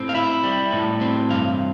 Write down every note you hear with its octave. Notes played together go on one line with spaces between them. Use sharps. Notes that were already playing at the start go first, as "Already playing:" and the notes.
Already playing: A2 C4
F5
E4 E5
G3
A2
C4
G2 F5